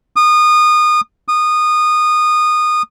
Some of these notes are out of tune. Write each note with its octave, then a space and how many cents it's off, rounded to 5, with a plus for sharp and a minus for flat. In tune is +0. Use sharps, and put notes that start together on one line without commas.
D#6 -25
D#6 -20